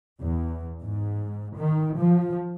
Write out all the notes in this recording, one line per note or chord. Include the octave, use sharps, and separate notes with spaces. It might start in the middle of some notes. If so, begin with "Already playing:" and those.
E2
G#2
D#3
F3